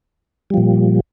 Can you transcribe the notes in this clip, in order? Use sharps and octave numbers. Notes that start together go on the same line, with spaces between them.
A#2 F3 G3